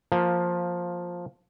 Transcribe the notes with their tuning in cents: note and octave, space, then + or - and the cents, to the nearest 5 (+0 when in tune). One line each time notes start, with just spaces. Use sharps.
F3 +10 A#3 +0